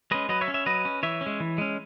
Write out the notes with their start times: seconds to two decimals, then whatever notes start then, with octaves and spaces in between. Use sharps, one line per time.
0.11 G#3 C#4 B4 D#5
0.29 F#3 B4 D#5
0.41 C#5 E5
0.48 C#4
0.54 C#5 E5
0.66 F#3 B4 D#5
0.85 C#4
1.03 E3 C#5 E5
1.21 C#4
1.26 G#3
1.40 E3
1.58 G#3 C#4